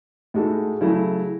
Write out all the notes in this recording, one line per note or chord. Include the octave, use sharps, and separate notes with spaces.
A2 G#3 D#4 F#4 A4
C#3 F#3 A3 E4